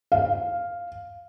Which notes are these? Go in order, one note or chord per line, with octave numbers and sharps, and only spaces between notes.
F5